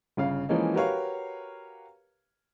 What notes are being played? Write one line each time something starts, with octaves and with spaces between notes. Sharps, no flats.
G1 C#3 F5
E3 F3 G#3 A#3 C#4 D#4
F#4 G4 A#4 B4 C#5 F5